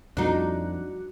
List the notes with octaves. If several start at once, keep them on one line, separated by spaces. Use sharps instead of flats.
F2 F3 G3 A3 D4 D#4 F#4 F#6